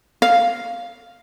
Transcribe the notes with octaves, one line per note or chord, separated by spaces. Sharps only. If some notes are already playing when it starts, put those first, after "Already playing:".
F5